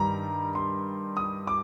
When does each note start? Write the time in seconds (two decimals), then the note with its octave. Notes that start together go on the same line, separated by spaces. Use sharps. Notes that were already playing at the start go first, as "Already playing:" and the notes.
Already playing: G2 D#3 G3 A#5
0.55 C6
1.17 D#6
1.47 D6